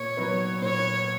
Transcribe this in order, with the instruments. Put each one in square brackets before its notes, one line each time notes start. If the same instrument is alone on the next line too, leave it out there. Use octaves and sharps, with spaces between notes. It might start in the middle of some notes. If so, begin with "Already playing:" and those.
Already playing: [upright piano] A#2 [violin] C#5
[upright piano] F#3 B3
[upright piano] A#2 [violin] C#5